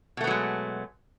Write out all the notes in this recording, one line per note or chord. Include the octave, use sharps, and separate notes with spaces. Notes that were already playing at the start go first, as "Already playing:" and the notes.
B2 F#3 G#3 A3 B3